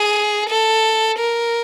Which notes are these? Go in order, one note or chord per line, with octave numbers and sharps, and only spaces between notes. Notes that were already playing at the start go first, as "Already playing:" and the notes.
Already playing: G#4
A4
A#4